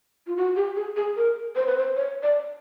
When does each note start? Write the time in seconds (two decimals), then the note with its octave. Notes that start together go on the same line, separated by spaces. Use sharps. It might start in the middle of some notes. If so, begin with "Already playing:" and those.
0.27 F4
0.37 F#4
0.56 G4
0.76 G#4
0.96 G#4
1.17 A#4
1.56 C5
1.67 B4
1.78 C5
1.96 C#5
2.23 D5